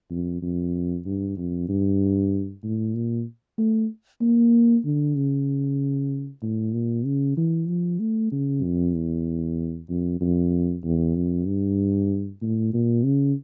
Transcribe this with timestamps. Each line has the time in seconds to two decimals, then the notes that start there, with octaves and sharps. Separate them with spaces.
0.11 F2
0.42 F2
1.05 G2
1.37 F2
1.68 G2
2.63 A2
2.95 A#2
3.58 A3
4.21 A#3
4.85 D3
5.16 C#3
6.42 A2
6.73 A#2
7.05 C#3
7.37 E3
7.68 F3
7.99 A3
8.32 C#3
8.63 F2
8.95 E2
9.89 F2
10.20 F2
10.84 E2
11.15 F2
11.47 G2
12.42 A2
12.73 A#2
13.05 C#3